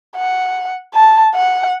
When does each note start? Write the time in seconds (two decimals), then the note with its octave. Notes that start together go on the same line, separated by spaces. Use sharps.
0.16 F#5
0.94 A5
1.35 F#5